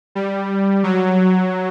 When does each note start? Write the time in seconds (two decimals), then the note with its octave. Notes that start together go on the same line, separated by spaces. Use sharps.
0.15 G3
0.84 F#3